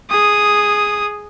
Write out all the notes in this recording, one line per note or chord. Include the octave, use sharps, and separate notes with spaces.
G#4 D#6